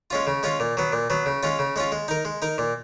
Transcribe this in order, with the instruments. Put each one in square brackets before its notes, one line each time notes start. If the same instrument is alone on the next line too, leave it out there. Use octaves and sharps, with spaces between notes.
[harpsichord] G#3 C#4 F4
C#3
G#3 C#4 F4
A#2
F#3 B3
A#2
F#3 B3
C#3
G#3 C#4 F4
C#3
G#3 C#4 F4
G#3
D#4 A#4
G#3
D#4 A#4
A#2